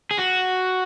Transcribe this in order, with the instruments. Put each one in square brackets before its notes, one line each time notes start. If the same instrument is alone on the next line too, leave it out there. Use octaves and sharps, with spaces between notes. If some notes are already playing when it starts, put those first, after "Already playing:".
[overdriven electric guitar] G#4
F#4